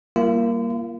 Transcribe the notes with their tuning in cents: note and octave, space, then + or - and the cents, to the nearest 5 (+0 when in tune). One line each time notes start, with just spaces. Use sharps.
G3 +0 A#3 +5 F4 -40